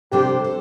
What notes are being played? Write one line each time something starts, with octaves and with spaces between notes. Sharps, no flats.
C3 G3 D4 G4 A4 C5
A4 C5